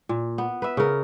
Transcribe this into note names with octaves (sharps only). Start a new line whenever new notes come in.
A#2
B3
B4 E5
C#3 A#4